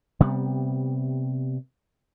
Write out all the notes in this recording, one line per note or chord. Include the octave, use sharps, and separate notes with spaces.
C3 G3 B3